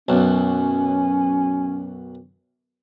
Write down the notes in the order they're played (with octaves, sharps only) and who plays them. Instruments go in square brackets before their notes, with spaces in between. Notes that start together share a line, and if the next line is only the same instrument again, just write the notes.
[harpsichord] B1 F#2 [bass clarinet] C#4